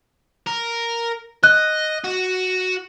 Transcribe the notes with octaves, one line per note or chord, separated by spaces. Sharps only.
A#4
D#5 F#6
F#4